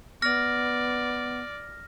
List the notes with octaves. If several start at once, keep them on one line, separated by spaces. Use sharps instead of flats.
B3 D5 F6 A#6